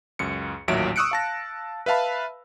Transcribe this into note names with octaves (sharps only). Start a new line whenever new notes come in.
C#2 F#2 C#7
A1 D#2 A#2 F#3 E5 D7
C#6 D#6 E6 F#6 C#7 D7
F5 A5 A#6
B4 E5 F5 A5 B5